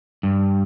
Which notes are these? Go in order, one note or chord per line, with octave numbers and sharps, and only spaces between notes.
G2